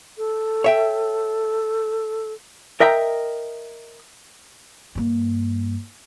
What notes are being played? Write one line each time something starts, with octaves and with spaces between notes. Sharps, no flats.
A4
C#5 E5 G5
A#4 D#5 E5 G5 A#5
G2 A#3